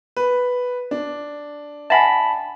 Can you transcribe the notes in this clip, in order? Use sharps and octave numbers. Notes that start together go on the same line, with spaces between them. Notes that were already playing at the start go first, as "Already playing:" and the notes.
B4
D4
E5 F#5 G#5 A5 B5